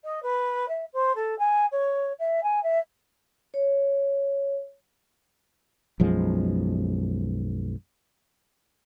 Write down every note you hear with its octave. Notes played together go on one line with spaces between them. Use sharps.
D#5
B4
E5
C5
A4
G#5
C#5
E5
G#5
E5
C#5
B1 F#2 F3 G#3